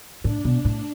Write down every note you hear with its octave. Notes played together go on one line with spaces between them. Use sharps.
A2 D4
B2
A2